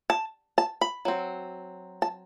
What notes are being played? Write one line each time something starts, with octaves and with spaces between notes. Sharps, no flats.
A5
A5
B5
F#3 C4
A5